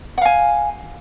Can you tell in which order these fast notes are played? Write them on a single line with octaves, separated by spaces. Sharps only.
F#5 F5 G#5